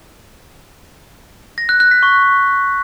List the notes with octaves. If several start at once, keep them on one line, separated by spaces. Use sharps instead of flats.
A#6
F#6
F#6
B6
C#6